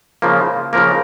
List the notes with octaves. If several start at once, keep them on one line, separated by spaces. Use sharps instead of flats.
C#3 F3 A#3
C#3 F3 A#3 A#4